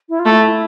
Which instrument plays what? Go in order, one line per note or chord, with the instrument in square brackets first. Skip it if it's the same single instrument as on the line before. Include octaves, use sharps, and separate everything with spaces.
[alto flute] E4
F4
[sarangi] A3 [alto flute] E4